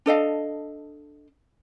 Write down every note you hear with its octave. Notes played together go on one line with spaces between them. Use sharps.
D4 A4 D#5 F5